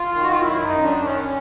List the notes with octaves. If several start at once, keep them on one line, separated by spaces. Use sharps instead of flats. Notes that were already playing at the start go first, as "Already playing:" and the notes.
Already playing: F4
D#3
F#4
F4
F#2 E4
D#4
F#2
D4
D#3
C#4
C#4